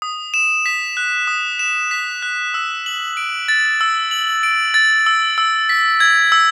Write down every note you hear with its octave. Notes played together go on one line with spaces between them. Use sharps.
D#6
E7
B6
F#6
D#6
E7
B6
F#6
E6
F#7
D7
A6
E6
F#7
D7
A6
E6
E6
B6
G#6
E6